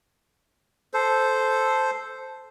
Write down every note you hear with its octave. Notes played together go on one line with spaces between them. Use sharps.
A4 C5